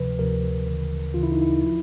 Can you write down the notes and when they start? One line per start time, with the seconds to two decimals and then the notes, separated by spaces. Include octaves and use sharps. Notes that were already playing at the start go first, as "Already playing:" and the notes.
Already playing: D2 C3 F3 B4
0.19 D2 C3 F3 A#4
0.66 D2 C#3 E3
1.14 D2 C#3 E3 F4
1.23 E4
1.32 D#4
1.41 E4
1.64 F3